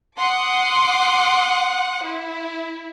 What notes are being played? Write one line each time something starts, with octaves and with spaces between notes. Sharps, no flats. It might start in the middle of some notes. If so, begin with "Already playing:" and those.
F#5 C6 D6 D#6
E4